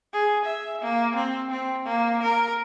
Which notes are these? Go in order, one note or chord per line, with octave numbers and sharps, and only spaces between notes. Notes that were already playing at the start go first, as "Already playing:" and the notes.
G#4
E5
A#3
C4
C4
A#3
A#4